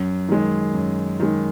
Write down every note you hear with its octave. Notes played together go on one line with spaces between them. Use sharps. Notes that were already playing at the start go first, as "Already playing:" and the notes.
Already playing: F#2
D#3 G#3
F#2
D#3 G#3